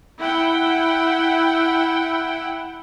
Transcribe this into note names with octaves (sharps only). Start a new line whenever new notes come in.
E4 F#5 G5